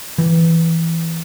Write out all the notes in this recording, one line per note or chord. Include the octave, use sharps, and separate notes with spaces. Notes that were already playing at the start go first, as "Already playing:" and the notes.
E3